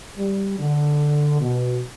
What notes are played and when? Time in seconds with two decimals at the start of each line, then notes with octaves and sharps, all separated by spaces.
0.18 G3
0.58 D3
1.40 B2